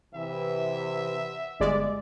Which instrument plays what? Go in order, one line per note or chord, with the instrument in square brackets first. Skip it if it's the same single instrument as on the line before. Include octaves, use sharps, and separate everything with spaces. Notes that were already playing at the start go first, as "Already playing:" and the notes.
[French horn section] C3 E3 [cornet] E5
[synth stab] G1 G#3 D5